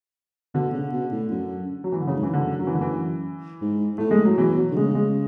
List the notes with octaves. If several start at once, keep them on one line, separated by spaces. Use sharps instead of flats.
B2 D3
C#3
B2
A2
F#2
F#3
E3
D3
F#2 C#3
G#2
F#2 E3
D3
F#3
E3
D3
E3
G#2
A2 A3
G#3
F#3
B2 E3
F#3
D3
C#3 G#3
G#3